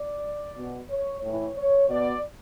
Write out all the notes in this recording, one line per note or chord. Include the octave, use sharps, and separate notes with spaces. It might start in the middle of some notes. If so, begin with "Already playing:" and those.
Already playing: D5
B2
C#5
A2 E3 C#5
C#5
B2 D5